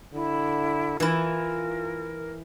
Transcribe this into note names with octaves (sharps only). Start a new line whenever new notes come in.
D3 E4
E3 E4 F4 A#4